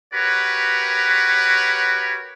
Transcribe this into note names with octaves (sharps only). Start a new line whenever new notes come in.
F#4 G4 A#4 B4 C#5